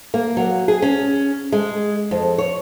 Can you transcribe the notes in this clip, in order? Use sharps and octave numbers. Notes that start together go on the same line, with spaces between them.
A#3
F#3
G#4
C#4
G#3
F2
C#5